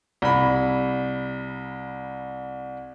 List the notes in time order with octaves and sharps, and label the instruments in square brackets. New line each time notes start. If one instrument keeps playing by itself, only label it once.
[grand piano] C2 B5